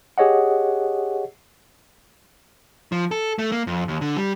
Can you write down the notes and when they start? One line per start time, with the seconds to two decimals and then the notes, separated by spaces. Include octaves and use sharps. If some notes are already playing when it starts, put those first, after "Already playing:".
0.18 G4 G#4 C#5 D#5 F#5
2.92 F3
3.11 A4
3.39 A3
3.52 A#3
3.67 F2
3.88 D#2
4.01 D3
4.17 G3